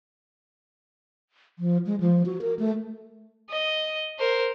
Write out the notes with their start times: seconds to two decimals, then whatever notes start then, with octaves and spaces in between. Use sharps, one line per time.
1.59 F3
1.86 G#3
2.00 F3
2.26 F#4
2.41 A#4
2.59 A3
3.50 D#5
4.19 A#4 C5